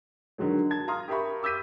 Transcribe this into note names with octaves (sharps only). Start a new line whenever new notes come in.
D3 D#3 F#3 G#3
A5 G#6
F5 A#5 C6 D#6 F6
G4 A#4 E5 A#5 B5 C#6
D6 E6 G6 B6 D#7